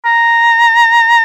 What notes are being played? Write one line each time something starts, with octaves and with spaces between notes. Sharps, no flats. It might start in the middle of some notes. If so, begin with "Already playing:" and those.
A#5